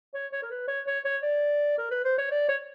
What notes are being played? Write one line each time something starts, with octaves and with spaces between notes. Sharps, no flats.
C#5
C#5
A#4
B4
C#5
C#5
C#5
D5
A#4
B4
C5
C#5
D5
C#5